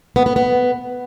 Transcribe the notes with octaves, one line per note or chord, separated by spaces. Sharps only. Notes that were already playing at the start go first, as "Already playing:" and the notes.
B3
B3
B3